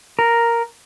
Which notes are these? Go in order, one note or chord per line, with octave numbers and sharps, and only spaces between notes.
A#4